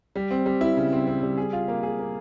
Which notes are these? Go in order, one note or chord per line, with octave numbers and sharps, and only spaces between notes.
G3
C4
G3
E4
C#3
C4
C4
G3
G#4
F4
A#3
G#4
A#3